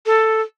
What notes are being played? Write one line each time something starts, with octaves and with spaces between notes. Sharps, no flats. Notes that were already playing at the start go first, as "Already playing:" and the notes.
A4